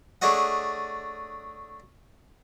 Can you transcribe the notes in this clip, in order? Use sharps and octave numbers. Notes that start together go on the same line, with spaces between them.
A3 D4 G#4 C#5 D#5 F#5